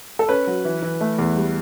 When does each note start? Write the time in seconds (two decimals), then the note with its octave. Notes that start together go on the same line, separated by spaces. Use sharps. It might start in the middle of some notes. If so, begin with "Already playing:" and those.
0.19 A4
0.28 C#4 B4
0.47 F#3
0.65 E3
0.82 E3
1.01 A3
1.19 E2
1.36 G3